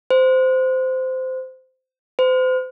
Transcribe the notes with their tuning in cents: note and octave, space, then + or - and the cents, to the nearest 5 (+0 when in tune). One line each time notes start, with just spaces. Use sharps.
C5 -15
C5 -35